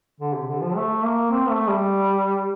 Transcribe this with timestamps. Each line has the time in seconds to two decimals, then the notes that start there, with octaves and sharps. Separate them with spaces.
0.20 D3
0.34 C3
0.48 D3
0.61 F3
0.76 A3
1.03 A#3
1.31 C4
1.49 A3
1.68 G3